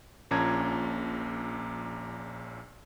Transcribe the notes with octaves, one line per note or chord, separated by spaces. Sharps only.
A#1 A#2 C#4 A5 A#5 G#6